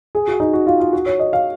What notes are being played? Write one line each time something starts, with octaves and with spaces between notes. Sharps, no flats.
G#4
F#4
D#4
F#4
F4
F4
F#4
C#5
D#5
F5